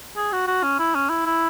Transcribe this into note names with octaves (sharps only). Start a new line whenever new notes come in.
G#4
F#4
F#4
C#4
E4
C#4
E4
E4